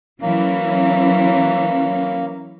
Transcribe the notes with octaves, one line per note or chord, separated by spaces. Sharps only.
E3 F#3 A#3 C#4